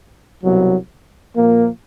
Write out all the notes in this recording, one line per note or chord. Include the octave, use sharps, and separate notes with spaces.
C2 B2 F#3
A#2 F3 A#3